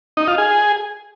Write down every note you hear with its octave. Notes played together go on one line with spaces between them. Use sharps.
D#4
F4
G#4